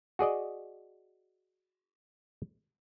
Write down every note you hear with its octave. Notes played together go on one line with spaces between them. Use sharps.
F#4 G#4 D5 D#5